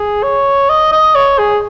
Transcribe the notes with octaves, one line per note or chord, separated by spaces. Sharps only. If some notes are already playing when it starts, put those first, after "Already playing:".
Already playing: G#4
C#5
D#5
D#5
C#5
G#4